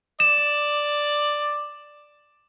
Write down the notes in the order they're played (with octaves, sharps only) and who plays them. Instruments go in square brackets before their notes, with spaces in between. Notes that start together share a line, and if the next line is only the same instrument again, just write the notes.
[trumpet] D5 [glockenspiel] E7